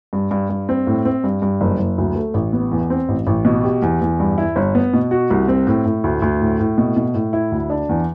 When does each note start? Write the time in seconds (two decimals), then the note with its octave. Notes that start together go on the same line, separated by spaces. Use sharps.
0.13 G2
0.31 G2
0.50 G2
0.69 C4
0.87 A2
1.05 C4
1.24 G2
1.42 G2
1.61 F#1
1.79 F#1
1.98 D2
2.16 A3
2.34 A1
2.53 B3
2.72 E2
2.90 C4
3.09 A1
3.27 A1
3.45 B2
3.64 G4
3.82 E2
4.01 E2
4.20 G2
4.38 E4
4.56 G1
4.75 B3
4.94 B2
5.11 F#4
5.30 C2
5.48 C4
5.67 A2
5.85 A2
6.04 D2
6.22 D2
6.41 A2
6.59 A2
6.78 B2
6.96 B2
7.14 A2
7.33 E4
7.52 D2
7.70 D4
7.89 E2